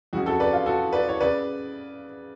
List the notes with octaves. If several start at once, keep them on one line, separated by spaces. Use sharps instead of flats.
F2 C#3 F#4
F#4 A4
B4 D5
F4
F#4 A4
B4 D5
C#5
C#3 B4 D5